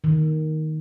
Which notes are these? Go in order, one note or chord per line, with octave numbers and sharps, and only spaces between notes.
D#3